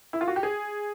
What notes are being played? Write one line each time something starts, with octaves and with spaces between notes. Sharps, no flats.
E4
F4
F#4
G4
G#4